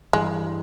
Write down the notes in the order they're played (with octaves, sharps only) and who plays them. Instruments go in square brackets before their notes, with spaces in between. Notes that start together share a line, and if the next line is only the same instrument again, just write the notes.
[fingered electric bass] G2 E3 G3 [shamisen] G#3